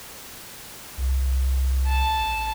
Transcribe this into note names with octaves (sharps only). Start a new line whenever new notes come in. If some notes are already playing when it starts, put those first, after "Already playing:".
C2
A5
A1